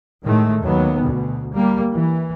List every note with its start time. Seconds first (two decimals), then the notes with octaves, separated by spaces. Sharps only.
0.24 A2 D#3 G#3 A3
0.61 D#2 F#3 B3
1.02 D2 B2
1.55 G3 A#3
1.93 E3